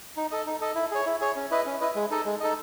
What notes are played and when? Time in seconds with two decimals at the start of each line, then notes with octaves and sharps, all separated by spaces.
0.17 D#4
0.31 A4 D#5
0.46 D#4
0.61 A4 D#5
0.75 E4
0.91 G#4 C#5
1.06 E4
1.21 G#4 C#5
1.36 C#4
1.51 E4 B4 D#5
1.66 C#4
1.81 E4 B4 D#5
1.95 G#3
2.11 D#4 A4 D#5
2.25 G#3
2.40 D#4 A4 D#5